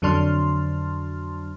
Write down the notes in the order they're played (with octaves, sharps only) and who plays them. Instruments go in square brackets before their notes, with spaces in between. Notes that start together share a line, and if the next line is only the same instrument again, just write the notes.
[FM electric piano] F2 D3 F#3 D4 C6 F6